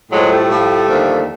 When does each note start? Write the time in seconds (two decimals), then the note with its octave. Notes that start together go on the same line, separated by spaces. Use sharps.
0.10 A2 F3 F#3 G#3
0.30 G3 A3
0.49 A2 F3
0.87 D#2 D3 F3